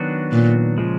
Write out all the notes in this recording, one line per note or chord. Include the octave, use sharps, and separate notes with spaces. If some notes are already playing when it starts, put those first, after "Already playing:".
Already playing: D#3 F#3 B3 D4 F#4
A#2
C#3 F3 G#3